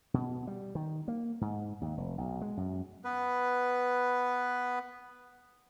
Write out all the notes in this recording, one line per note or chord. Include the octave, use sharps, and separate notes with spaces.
B2
G3
D#3
A#3
G#2
D#2
F1
B1
G#3
F#2
B3 B4